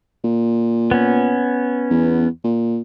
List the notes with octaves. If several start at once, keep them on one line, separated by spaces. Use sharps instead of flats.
A#2
B3 C#4
E2
A#2